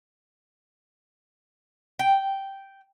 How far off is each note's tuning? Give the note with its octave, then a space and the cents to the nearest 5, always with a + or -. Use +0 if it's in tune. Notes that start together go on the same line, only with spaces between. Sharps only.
G5 -5